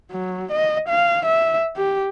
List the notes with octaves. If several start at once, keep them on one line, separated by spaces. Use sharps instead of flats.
F#3
D#5
F5
E5
G4